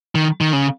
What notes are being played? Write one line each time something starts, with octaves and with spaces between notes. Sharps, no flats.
D#3
D#3
C#3